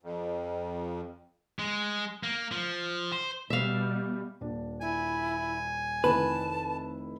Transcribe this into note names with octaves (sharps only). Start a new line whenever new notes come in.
F2
G#3
A#3
F3
C5
B2 G3 E5 F5
D#1 D4
E4 G#5
F1 D#3 E4 B4 A5